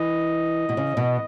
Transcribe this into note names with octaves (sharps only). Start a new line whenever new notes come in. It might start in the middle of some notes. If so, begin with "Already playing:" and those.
Already playing: E3 D#5
B2
C#3
B2